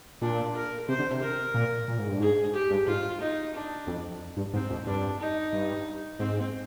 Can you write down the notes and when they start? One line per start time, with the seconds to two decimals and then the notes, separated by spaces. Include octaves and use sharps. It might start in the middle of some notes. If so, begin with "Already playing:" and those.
0.21 A#2 D4
0.56 A#4
0.88 C3 C5
0.99 D3
1.10 C3
1.22 A#4
1.54 A#2
1.88 A#2
1.99 G#2
2.09 G2
2.20 G#2 G#4
2.54 G4
2.71 G2
2.87 G#2 F4
3.21 D#4
3.54 D4
3.87 F2
4.37 G2
4.53 G#2 C4
4.70 F2
4.86 G2 D4
5.19 D#4
5.53 G2
6.19 G#2 C4